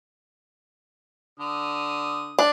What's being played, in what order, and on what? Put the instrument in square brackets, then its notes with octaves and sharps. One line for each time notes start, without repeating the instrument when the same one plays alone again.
[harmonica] D3 D#6
[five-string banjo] D4